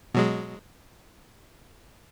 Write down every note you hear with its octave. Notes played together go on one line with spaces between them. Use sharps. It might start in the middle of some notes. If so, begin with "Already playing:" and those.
B2 F#3 G#3